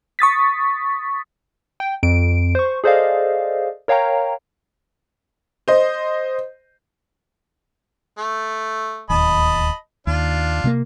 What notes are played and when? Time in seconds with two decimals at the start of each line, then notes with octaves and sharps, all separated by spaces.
0.19 C#6 D#6 A6 B6
1.80 G5
2.03 F2 D7
2.55 C5 C#6
2.84 G#4 A4 C5 D5 D#5 F5
3.88 A#4 C#5 F5 G5 A#5
5.68 C5 D#5
8.18 A3
9.10 D1 D#2 D#5 A5 B5
10.07 D#2 D4 F4
10.64 C3 A3 A#3